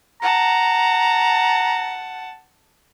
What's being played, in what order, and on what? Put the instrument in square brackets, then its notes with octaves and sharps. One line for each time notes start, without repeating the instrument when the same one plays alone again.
[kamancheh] F#5 A5 [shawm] A#5